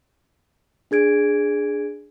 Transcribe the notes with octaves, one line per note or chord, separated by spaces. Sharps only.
D4 G#4 G#6 D7